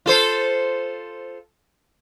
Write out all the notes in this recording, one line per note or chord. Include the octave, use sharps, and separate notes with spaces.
F4 A4 C5